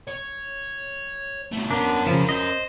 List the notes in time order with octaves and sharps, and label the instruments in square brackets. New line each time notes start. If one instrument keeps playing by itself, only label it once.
[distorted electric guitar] C#5
B2 A3
[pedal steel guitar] B3 D4 [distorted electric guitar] C#4 A#4
[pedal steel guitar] C#3 F3
C5 D#5